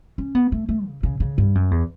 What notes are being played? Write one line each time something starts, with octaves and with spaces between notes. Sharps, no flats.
C#4
B3
A3
A3
C#3
C#3
C#3
G2
F#2
E2